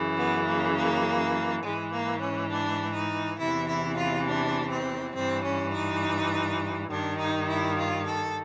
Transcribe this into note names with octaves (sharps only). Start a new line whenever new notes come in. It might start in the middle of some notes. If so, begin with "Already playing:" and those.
Already playing: F#2 C#3 E3
B3
A#3
A#3
G#2 E3 G#3
A#3
C#4
D4
D#4
E2 C3 E3 E4
E4
F4
D4
C4
G2 E3 C4
C#4
D#4
G2 D#3 D4
D#4
E4
F4
A4